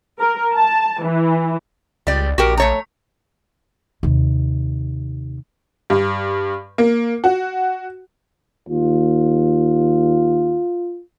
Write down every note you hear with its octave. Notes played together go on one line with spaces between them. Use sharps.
A#4
A5
E3
C#2 G3 D5
A#1 F#4 G4 A#4
A3 C#5 A#5
D#2 C3
G2
A#3
F#4
D#2 F4